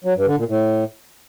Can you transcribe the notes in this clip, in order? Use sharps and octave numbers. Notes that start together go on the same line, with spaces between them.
F#3
G2
D3
A#2
A2